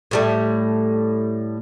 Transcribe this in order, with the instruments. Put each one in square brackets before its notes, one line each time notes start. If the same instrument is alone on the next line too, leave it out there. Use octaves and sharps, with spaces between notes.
[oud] A2 G3 A3